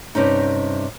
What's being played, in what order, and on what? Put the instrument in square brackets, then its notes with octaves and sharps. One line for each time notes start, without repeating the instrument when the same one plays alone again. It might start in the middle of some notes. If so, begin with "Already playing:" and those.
[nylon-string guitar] G2 C3 C#4 D#4